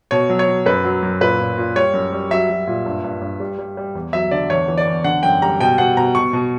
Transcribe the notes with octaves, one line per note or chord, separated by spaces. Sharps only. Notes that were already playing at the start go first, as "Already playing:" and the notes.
B2 C#5
F#3
C#5
F#3
F#2 B4
F#3
F#2
A#2 B4
A#2
A#2
G3 C#5
F#2
G3
F#3 E5
F#3
A#2
G2
G2
G2
G3
G3
G3
E2
F#3 E5
D3 D5
E2 C#5
E3
D5
E2
D3 F#5
F#2 G5
G3 A#5
B2 G5
B2 F#5
B2 A#5
B2 C#6
B2